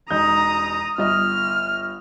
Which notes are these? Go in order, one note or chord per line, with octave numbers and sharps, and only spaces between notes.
E1 D#4 A#5 D#6 G6
G1 D#5 D#6 F6